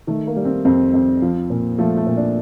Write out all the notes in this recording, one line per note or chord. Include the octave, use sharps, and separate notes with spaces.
D#3 A3
A#3
G3
C4
F2 C4
F2
F3
A#2
F3 A3
A3
A#2
D4